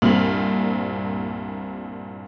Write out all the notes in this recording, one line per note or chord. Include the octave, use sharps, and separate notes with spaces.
C2 G2 A#2 C4 F6 F#7